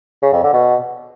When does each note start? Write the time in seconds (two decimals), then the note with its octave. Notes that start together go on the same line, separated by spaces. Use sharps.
0.22 C#3
0.33 F2
0.43 D3
0.53 B2